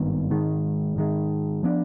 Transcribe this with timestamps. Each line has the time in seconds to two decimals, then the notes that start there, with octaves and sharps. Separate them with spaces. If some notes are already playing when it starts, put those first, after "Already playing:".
Already playing: G#1 G2 D#3 B3
0.30 G#2 D#3 G#3
0.96 G#2 D#3 G#3
1.63 F3 B3 D4